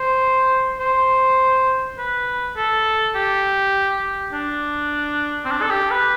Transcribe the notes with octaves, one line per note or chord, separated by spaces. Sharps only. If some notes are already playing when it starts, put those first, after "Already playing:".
Already playing: C5
C5
B4
A4
G4
D4
C4
D4
A4
G4
B4